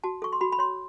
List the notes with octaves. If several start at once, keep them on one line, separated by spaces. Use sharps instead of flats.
F#4 A5
A4 C#6
C6
F#4 B5
B5
C#5 C6